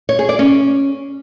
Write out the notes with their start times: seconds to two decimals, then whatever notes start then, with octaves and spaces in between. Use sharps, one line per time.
0.09 C#5
0.19 G#4
0.29 D5
0.39 C#4